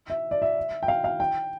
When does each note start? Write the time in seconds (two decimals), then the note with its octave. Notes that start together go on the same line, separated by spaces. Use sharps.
0.10 E5
0.31 D5
0.42 E5
0.83 G5
0.88 F5
1.04 F5
1.20 G5